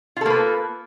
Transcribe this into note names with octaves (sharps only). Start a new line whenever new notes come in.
A#3 F4 A4 B4